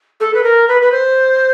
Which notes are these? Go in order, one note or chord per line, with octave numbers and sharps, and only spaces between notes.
A4
B4
A#4
B4
B4
C5